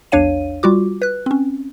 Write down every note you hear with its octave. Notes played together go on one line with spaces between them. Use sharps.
A#1 E2 D4 C#5 F5 D#7
G3 F4 F#4 D6
B4 F#6
C4 C#4